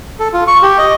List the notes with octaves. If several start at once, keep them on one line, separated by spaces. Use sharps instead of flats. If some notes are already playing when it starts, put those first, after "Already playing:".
A4
F4
C#6
G4
D#5